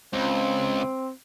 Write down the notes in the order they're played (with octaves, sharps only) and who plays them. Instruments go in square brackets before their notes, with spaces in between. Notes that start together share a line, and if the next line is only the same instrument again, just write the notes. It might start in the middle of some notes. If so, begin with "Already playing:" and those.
[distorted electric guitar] C#2 [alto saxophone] C4